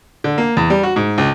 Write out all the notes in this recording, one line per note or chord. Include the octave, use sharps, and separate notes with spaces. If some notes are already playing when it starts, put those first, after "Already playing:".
D3
A#3
E2
G3
F#4
G#2
C#2